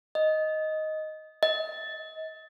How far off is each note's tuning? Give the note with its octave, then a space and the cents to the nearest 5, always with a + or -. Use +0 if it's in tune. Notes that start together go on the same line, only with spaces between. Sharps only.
D#5 +5
D#5 +35